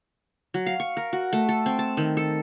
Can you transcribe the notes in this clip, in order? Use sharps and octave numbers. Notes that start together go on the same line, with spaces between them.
F#3
F5
C#6
A#4
F#4
A3
A4
C4
A5
D#3
A4